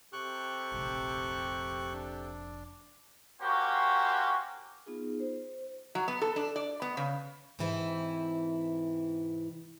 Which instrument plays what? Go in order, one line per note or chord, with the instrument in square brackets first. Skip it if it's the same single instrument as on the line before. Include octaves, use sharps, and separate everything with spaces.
[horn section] C3 G4 A4 [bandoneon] C#6 F#6
[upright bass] F1 A#1
[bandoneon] D4
[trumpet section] A#3 C#4 F#4 G4 C5
[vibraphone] B3 D#4 F4 G#4
C5
[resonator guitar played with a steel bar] F#3
B3
A4
D4
D5
B3
C#3
[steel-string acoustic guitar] G#2 C3 E3 E4